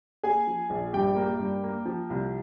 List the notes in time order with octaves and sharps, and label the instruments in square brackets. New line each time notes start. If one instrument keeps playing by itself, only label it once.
[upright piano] A#3 G#4 G#5
F3
A#1
G2 G4 G5
A#3
G2
A#3
F3
C2